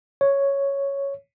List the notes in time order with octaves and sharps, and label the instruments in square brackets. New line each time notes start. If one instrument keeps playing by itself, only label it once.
[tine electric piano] C#5